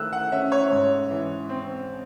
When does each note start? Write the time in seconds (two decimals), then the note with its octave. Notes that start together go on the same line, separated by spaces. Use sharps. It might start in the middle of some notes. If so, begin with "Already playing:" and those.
Already playing: D#3 A3 E6 F#6
0.13 F#5
0.32 C#4 E5
0.52 C#5
0.71 G#2
1.10 E3
1.49 C4